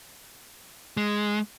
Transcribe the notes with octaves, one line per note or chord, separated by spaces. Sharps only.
G#3